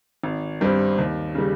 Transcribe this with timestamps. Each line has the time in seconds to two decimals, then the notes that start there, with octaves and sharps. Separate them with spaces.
0.24 G#1
0.61 G2 G3 C4
0.98 D#2
1.35 C#3 G3